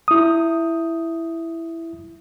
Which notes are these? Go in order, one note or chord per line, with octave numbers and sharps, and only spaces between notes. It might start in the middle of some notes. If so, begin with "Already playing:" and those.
E4 D#6